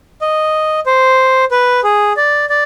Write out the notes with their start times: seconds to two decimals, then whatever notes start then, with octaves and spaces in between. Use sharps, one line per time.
0.21 D#5
0.86 C5
1.51 B4
1.84 G#4
2.17 D5
2.49 D5